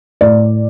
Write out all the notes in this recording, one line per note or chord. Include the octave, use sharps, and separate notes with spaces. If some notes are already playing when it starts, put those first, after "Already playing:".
A2 D5